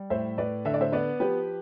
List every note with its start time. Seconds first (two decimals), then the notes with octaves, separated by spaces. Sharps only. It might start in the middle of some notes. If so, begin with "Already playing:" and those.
Already playing: G3
0.10 A2 C5 E5
0.38 A2 B4 D5
0.65 D3 E5
0.74 D5
0.81 C5 E5
0.92 B3 B4 D5
1.20 F3 G4 B4